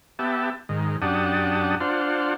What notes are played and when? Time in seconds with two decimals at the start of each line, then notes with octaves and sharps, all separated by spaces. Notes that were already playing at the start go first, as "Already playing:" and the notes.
0.19 B3 G4 E5 A5
0.69 G#2 D#3
1.02 F#2 D4 G4 F#5 A5 D#6
1.80 D4 F4 C5 F#5